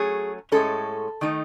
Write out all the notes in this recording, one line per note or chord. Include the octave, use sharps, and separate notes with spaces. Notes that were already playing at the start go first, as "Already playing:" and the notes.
Already playing: F#3 A3 C#4 G#4
A2 G#3 C#4 A4
D#3 A3 D#4